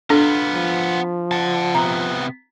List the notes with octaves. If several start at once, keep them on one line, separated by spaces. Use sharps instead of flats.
B3 D4 F4 A4
F3
F#5 A5
C3 B3 A#5